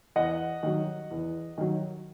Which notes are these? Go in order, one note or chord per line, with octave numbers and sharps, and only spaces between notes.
E2 D#5 F#5
D#3 F#3
E2
D#3 F#3